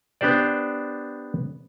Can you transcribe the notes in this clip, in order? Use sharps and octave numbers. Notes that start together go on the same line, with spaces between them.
B3 D4 G4 C5 D5